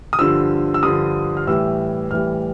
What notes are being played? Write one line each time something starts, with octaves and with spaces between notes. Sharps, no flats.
D#6
G2 D3 F3 E6
E6
G2 D3 F3 D#6
F6
A2 E3 G3 E6
A2 E3 G3 F6